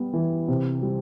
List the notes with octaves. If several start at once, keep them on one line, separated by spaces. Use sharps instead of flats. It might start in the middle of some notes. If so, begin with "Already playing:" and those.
Already playing: G3 B3
E3
C3
G3